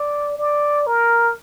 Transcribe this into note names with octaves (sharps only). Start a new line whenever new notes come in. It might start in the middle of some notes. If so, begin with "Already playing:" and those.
Already playing: D5
D5
A#4